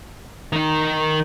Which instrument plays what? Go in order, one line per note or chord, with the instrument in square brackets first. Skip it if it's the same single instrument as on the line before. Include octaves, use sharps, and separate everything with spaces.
[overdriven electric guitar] D#3 D#4